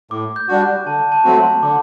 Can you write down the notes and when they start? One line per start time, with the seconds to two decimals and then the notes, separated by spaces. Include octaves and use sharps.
0.11 A2 D6
0.36 G6
0.48 G3 D4 F#4
0.61 F#6
0.86 D3 A5
1.12 A5
1.24 F#3 A3 C4 F#4
1.38 C6
1.62 D3 D6